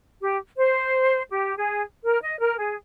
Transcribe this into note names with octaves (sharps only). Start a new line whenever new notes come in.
G4
C5
G4
G#4
A#4
D#5
A#4
G#4